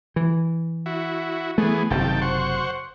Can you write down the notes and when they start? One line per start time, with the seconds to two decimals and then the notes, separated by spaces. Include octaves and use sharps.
0.16 E3
0.86 E4 F#4
1.58 E3 A3 B3 G#4
1.90 F#1 C3 D#3 G5 A5
2.21 C5 F#5 C#6